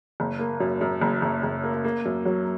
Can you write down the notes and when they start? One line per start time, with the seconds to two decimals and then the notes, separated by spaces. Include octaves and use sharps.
0.20 F#1
0.39 A#3
0.60 F#2
0.81 F#2
1.01 F#1
1.22 F#1
1.43 F#1
1.64 A#3
1.84 A#3
2.05 F#2
2.26 F#3